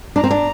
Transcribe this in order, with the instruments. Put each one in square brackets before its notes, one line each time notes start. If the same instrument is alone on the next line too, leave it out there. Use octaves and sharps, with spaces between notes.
[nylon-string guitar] D4 [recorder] A#5
[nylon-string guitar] C4
D4